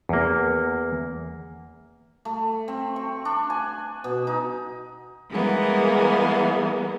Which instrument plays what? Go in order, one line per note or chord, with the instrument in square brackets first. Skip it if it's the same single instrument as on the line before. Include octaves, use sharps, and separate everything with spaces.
[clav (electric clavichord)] E2 A#3
[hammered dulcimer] A3
C4
C#6
D4
G#5
B2
D#4
[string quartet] E3 G3 G#3 A#3 B3